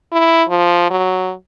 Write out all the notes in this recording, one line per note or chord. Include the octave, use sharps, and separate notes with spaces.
E4
F3
F#3